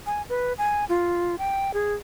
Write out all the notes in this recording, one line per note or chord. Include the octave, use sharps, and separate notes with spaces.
G#5
B4
G#5
F4
G5
G#4